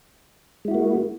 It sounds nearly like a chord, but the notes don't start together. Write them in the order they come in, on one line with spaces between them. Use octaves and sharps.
G#3 E4 F#4 A#3